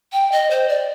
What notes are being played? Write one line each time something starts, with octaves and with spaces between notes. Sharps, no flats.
G5
D#5
C5
D5